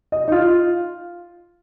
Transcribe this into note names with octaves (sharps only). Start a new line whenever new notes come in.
D#5
D#4
F4